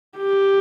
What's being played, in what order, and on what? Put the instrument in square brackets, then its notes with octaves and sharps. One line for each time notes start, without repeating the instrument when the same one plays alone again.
[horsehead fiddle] G4